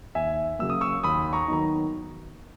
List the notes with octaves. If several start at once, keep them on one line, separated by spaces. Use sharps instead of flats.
D#2 E5 G#5
C#3 F#3 A#3 E6
D#6
C#6 E6
D#2 B5 D#6
A#5 C#6
D#3 F#3 B3 D#4 A#5